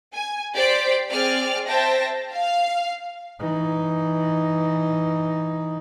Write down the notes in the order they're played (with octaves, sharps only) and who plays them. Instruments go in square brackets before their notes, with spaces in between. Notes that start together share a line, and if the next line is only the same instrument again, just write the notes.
[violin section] G#5
G4 C5 D5 C6 B6 D7
C4 G#4 D5 F6
C5 E5 G5 A5 A#6
F5
[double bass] E3 D#4